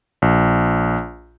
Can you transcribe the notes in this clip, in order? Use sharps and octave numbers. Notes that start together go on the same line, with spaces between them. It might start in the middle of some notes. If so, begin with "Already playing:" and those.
A#1